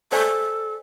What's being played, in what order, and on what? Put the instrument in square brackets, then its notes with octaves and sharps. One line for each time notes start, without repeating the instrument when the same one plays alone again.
[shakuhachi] A4 [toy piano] C5 D5 G#5